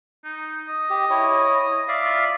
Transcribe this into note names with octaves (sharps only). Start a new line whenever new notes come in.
D#4
D#5
G4
E4 C#5
D5 E5 F5
F4